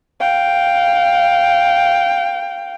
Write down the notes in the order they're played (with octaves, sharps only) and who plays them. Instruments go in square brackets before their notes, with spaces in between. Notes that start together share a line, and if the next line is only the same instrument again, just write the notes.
[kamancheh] F5 G5